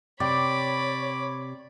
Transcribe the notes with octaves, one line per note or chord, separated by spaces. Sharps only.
C3 C#5 D5 G5 B5 D6